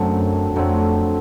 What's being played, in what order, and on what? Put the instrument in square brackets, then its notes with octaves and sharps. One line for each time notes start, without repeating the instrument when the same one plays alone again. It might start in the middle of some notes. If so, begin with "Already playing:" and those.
Already playing: [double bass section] F#2 [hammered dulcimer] D3 F#3 A3 C4
[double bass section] F2 [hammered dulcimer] D3 F#3 A3 C4